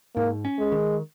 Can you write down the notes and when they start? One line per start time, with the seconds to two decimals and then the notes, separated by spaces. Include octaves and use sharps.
0.16 G#2 A#3
0.45 C#4
0.59 G#3
0.72 D#3